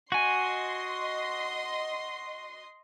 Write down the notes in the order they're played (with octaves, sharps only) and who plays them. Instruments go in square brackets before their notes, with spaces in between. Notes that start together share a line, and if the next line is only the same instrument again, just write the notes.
[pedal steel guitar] F#4 G#5 [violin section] D#5 C6